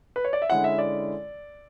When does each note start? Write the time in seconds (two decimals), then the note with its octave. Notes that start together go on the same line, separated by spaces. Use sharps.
0.16 B4
0.25 C#5
0.33 D5
0.42 E5
0.50 D3 G#3 C#4 E4 F#5
0.64 E5
0.78 D5